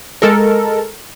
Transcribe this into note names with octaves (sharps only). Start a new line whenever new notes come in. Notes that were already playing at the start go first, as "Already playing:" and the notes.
G#3 A4 A#4